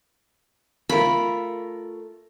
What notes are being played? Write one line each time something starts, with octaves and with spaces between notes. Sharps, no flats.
A3 F4 A#4 B5